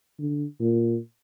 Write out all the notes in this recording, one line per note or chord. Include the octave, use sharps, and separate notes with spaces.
D3
A#2